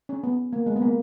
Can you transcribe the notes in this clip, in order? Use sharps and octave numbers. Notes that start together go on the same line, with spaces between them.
C#4
B3
A#3
G#3
B3
A#3